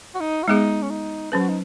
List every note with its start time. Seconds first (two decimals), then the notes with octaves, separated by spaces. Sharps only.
0.15 F#4
0.20 D#4
0.43 F#4
0.48 G#3 B3 D#4 G#4
0.82 C#4
0.90 D#4
1.32 F#3 C#4 G#4 B4
1.40 F#4
1.49 D#4